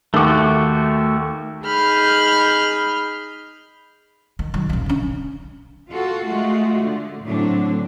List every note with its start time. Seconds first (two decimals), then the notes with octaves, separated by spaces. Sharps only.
0.14 D#2 A3 F#4 D6
1.64 D#4 G#4 B5 F6 G6
4.39 D#3
4.54 D#3 F#3
4.69 D#1 A#3
4.86 D3 C#4
5.91 F4 F#4 A4
6.27 G#3 A3 F4 F#4
6.81 D3
7.24 A2 D3 F#3 C4 D4